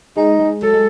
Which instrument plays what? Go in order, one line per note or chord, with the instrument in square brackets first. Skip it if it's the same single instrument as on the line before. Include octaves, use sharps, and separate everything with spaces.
[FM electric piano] G#3 [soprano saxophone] D#4
[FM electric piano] G#3
[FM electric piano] F#3 [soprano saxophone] A4
[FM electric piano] G#3